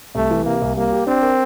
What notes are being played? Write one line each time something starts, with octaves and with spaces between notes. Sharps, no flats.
C2 A3
E3
C3 A#3
C2
G3 A#3
G4
C4 D4
A#4